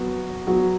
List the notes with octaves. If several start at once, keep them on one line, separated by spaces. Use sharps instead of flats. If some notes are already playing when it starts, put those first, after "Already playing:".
Already playing: F#3 B3 F#4
F#3 B3 F#4